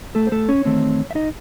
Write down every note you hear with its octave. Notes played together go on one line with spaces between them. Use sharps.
A3 A4
C5
A3 A4
C#4 C#5
E2 D#3 A3 C4
E5
D#4 D#5